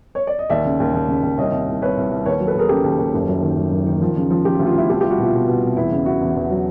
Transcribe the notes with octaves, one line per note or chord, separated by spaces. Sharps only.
C#5
D5
D#5
D#2 D5 E5
C#3
D#2
D#2
C#3
D#2
C2 C#5 D#5
C2
C2
C2 B4 C#5
C2
C2
D#2 B4 C#5
F#3
A4 B4
D#2 G#4 A#4
C#3 G4 A4
D#2
D#2
F#1
F#2
D#3
F#2
F#1
D#3
F3
C#3
F3
C#3 F4 G4
F4
D2
F4
D2 E4 F#4
C2 F4 G4
F4 G4
G3
E4 F#4
B2 F4
B2
B2
C2
E2 E4
C#3
C#3 E4 F#4
E2
E2
F#3